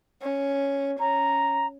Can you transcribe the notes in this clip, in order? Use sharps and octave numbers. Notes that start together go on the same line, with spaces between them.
C#4
C#4 A#5